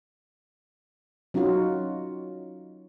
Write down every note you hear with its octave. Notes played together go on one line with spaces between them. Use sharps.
F#3 C#4 D#4 F4 F#4